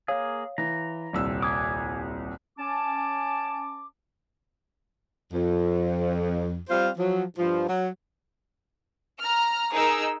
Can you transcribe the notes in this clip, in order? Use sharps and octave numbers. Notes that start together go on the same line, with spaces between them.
A#3 G#4 C#5 F5
E3 A#5
D#1 C2 E6
G#5 D6 D#6
C#4 A5 D6
F2
G3 C4 F4 C5 F5
F3 F#3
G2 F3
F#3
A#5 F6
D#4 G#4 A#4 E6